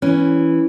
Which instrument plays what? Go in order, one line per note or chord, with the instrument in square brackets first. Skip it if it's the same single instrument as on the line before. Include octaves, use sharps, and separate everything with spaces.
[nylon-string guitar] E3 C#4